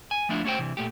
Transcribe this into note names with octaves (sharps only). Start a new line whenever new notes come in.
G#5
F3 A3 D4 E4 F4
A3 C#4 F#4 C5 G5
C3 E3
A#2 A3 G4